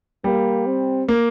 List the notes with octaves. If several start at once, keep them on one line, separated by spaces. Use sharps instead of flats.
G3 A#3
C4
A#3